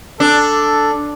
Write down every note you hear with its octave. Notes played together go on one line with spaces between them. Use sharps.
D4 A4